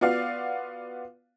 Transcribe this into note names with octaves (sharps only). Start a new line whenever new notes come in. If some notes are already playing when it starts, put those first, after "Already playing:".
B3 F4 F#4 D5 F5